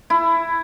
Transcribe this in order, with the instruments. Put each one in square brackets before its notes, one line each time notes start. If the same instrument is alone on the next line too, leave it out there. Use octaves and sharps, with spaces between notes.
[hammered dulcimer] E4